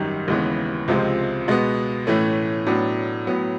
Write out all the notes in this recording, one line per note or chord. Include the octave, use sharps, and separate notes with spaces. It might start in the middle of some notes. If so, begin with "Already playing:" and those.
Already playing: G#1 F#2 D#3 G3
D#2 C#3 E3 G#3 B3
C#2 C3 F3 G#3 C4
B2 G#3 B3
A2 E3 A3 C#4
A2 F#3 B3 D4
A2 F#3 B3